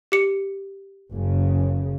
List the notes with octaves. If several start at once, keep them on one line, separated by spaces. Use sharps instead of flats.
G4 C#7
F#1 C#3